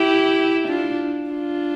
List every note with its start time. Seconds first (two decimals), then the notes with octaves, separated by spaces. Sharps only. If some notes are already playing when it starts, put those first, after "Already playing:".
Already playing: E4 G4
0.68 D4 F4
1.30 D4 F4